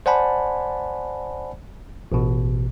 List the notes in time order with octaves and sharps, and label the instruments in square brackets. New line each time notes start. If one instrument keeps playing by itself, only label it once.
[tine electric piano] C5 D5 F#5 G#5 A5 B5
A1 B2